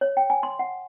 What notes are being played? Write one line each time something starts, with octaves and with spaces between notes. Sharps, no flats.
C#5
G5
G#5
C6
F#5